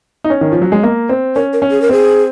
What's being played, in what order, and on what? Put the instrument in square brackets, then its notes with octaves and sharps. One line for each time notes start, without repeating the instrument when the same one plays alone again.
[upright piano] D#4
C#4
D#3
F3
F#3
G#3
A#3
C4
[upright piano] C#4 [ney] A#4
[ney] A#4
[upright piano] C#4
[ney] G#4
A#4
[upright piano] C4 [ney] G#4